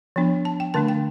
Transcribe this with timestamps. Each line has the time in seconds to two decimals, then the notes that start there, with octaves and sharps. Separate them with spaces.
0.16 F3 B3 D4
0.45 A5
0.60 G5
0.74 D3 A3 D4 A5
0.88 G5